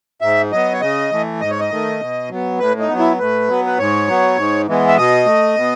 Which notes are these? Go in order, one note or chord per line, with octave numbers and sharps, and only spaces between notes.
G#2 E5
F#3 B3 D#5
C#5
C#3 D#5
E3 A3
G#2 D#5
C#5
D#5
D#3 A3
B2
F#3 B3
A2 B4
D#4
B3
F#3
E4
A2 B4
F#3 B3
B4
G#2 C#5
F#3 B3
G#2
E3 G#3 B3
E5
B2 D#5
A3
B2